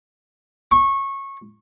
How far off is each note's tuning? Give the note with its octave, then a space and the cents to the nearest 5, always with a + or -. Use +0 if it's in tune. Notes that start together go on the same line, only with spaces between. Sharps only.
C#6 -20